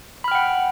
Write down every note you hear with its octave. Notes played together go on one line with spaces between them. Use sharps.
F#5 G5 B5 F6